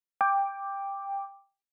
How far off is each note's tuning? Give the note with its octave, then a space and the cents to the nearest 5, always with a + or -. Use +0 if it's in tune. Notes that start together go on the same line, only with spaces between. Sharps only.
G5 +15 D6 +0